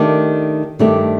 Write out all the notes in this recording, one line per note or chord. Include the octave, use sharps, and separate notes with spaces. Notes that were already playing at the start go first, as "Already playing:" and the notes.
Already playing: D#3 A3 D4 G4
G2 D#3 A3 D4 G4